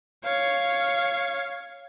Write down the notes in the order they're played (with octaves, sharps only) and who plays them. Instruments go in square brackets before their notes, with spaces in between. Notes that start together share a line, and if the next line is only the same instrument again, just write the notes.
[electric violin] C#5 F5